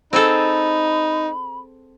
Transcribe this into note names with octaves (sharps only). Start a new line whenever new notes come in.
C4 D#4 G#4 A4 B5